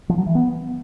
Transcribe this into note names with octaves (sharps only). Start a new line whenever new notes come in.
F3
F#3
E3
B3